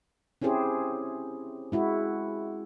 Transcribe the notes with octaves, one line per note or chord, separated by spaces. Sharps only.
C4 C#4 E4 G4 G#4 C5
G#3 E4 F#4